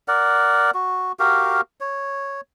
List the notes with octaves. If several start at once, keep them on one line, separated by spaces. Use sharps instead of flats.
A#4 D5 F#5
F#4
F#4 G4 A#4 F5
C#5